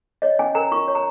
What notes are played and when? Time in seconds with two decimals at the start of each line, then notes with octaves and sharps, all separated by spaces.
0.22 C#5 D#5
0.39 C#4 G#5
0.55 A#4 A#5
0.72 F4 C#6
0.88 C#5
0.95 A#5